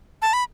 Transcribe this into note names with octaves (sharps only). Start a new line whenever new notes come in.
A5
B5